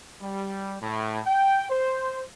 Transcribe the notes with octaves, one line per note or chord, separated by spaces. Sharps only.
G3
A2
G5
C5